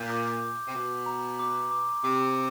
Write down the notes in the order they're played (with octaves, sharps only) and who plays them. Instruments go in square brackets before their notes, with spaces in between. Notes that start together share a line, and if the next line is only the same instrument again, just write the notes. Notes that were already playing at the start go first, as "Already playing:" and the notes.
Already playing: [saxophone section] A#2 [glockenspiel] G6
[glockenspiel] D6
D6
[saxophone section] C3
[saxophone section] B2 [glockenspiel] D6
[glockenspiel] A#5
D6
D6
[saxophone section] C3 [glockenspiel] D6